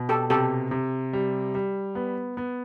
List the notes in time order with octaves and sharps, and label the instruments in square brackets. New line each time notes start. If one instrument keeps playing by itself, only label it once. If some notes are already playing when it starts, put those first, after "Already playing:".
Already playing: [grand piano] B2
[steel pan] G4 A4
[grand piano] C3 [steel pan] G4 A4
[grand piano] C3
G3
G3
B3
B3